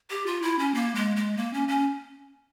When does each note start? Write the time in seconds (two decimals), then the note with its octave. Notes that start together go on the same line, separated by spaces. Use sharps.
0.10 G4
0.26 F4
0.42 E4
0.59 C#4
0.74 A#3
0.95 G#3
1.16 G#3
1.37 A#3
1.53 C#4
1.68 C#4